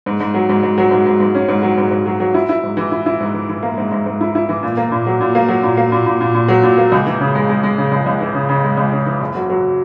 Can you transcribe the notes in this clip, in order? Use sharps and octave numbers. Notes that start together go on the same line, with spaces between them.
G#2
G#2
F#3
G#2
G#2
F#3
G#2
G#2
G#2
C#4
G#2
F#3
G#2
G#2
F#3
F#3
E4
E4
G#2
E3
E4
E4
G#2
E3
E3
A#3
G#2
G#2
G#2
E4
E4
E3
A#2
A#3
A#2
F#3
A#2
A#3
F#3
A#2
A#3
A#2
A#2
A#2
A#2
F#3
A#2
A#3
C#2
E3
C#3
G#3
G#3
G#3
C#3
C#2
C#2
E3
C#3
C#3
G#3
C#2
C#3
E3
F#1
F#3
F#3